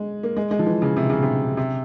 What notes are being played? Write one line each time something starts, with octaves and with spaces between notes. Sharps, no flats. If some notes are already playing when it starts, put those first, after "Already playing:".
Already playing: G#3
A#3
G#3
G#3
F3
E3
C#3
C3
C#3
C3
C3